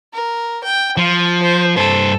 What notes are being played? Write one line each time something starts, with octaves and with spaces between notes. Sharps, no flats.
A#4
G5
F3 F4
C5
G2 A4 C5